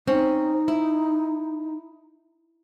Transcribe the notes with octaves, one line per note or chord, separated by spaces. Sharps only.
C4 C#4 D#4
E4